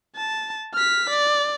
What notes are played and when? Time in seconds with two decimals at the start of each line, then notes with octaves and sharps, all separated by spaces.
0.16 A5
0.75 F6 B6
1.10 D5